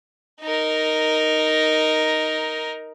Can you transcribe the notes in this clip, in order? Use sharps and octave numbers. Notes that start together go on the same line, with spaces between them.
D#4 A#4